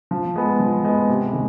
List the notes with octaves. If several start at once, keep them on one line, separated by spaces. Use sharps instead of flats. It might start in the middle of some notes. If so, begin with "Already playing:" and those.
F3
G#3 B3
F3
G#3 B3
C3
D#3 G#3